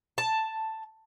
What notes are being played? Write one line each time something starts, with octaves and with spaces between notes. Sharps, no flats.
A5